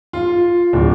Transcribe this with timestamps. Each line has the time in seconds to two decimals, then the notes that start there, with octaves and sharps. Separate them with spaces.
0.13 F4
0.73 D1